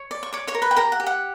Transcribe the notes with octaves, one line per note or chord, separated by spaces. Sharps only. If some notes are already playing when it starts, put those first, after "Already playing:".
Already playing: C#5
D5
C#6
C#5 D5 D6
C#5 C#6
A#4
B4 B5
G5
G4 A#4 A#5
F#5
G4
F#5